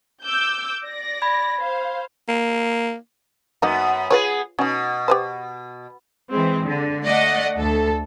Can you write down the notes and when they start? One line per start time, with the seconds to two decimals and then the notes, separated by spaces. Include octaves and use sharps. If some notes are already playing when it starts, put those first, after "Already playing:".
0.23 D6 E6 G6
0.86 D5 A#6
1.22 B5 G#6
1.61 C5 F5
2.29 A#3
3.62 F#2 A#3 B3 D#4 F#5
4.10 B3 F4 G#4 B4 C#5
4.59 B2 C#4 D#4
5.08 G4 B4 C5
6.30 E3 G#3 C4
6.65 D3
7.04 A3 D5 D#5 F#5
7.59 D2 A4